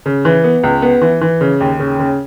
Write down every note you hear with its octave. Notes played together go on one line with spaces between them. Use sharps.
C#3
E3
B3
C#2
B3
E3
E3
C#3
D#2
C#3
C#3